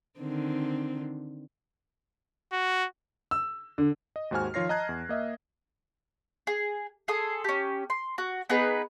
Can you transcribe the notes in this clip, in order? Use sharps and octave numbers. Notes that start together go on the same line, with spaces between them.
D3 D#3 C4
F#4
E6
D3
D#5
D#2 G#2 F#4 C5 G#5 F6
D#3 F3 F4 C#5 A#6 C7
D#5 A5 A#5 F#6 G#6
E2
A#3 D#5 E5
G#4
G#4 A4 C6 D#6
C#4 G4
C6
F#4
B3 D#4 G#4 B4